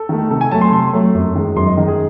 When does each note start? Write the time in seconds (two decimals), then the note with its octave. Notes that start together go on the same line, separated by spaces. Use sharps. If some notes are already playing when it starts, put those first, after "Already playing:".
Already playing: A4
0.09 D#3 A3
0.30 C3 A4
0.41 G#5
0.51 F#3 A3 A5
0.61 C6
0.72 C3 C6
0.93 F#3 A3
1.14 F#2
1.35 D#3 G#3
1.56 F#2 C6
1.67 D#5
1.77 D#3 G#3 D#5
1.88 G#4